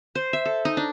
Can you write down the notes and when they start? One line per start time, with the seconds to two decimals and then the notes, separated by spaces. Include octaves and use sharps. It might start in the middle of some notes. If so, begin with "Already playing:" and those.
0.15 C5
0.33 E5
0.45 A4
0.65 D#4
0.77 D4